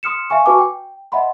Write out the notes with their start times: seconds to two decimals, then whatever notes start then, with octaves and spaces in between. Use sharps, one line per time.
0.03 C6 D#6 F6 C#7 E7
0.30 E5 F5 G#5 C#6
0.46 F#4 B4 G#5 A5 C#6 D6
0.58 G5
1.12 D#5 E5 F#5 A5 B5 C6